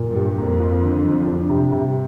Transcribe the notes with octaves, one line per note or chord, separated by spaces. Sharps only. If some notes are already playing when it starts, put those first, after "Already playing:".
Already playing: A#2
G2
G3
F2 A#3
F4
D3
F3
F2 D4
C3
G2 C3